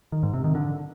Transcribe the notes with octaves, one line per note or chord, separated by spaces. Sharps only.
D#3
G#2
C3
D#3
D3